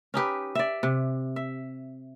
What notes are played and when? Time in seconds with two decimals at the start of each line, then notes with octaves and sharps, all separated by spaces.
0.14 C#4 D#4 G4 B4
0.55 D5 E5
0.83 C3
1.36 E5